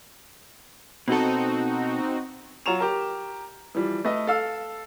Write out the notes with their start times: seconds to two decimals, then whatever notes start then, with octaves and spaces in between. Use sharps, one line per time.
1.08 B2 C4 D#4 F#4 A4
2.66 F#3 F4 A#5 C#6 E7 F7
2.80 G4 A#4
3.75 E3 F3 G3
4.05 A3 B4 D#5
4.27 A4 F5 E6